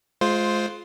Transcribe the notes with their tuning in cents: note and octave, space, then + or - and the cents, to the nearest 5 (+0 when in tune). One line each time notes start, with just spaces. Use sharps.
G#3 +35 F4 +5 C5 +0